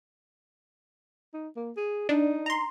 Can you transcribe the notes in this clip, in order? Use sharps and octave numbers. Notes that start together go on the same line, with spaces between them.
D#4
A#3
G#4
D4 D#4
A#5 C6